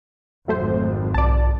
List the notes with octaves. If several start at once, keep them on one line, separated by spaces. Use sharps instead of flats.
G#1 F2 F#3 A3 C5
B1 D5 A5